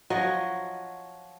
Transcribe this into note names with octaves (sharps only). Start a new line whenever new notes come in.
F3 F#3 F#4 D#5